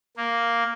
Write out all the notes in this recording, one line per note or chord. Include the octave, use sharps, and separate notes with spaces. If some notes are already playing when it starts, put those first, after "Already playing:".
A#3